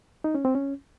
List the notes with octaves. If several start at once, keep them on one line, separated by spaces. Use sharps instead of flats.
D#4
C#4
C4
C#4